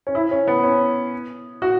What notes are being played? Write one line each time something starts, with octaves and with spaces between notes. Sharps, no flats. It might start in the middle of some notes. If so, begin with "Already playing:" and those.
C#4
E4
C#4
B3
C#4
F#4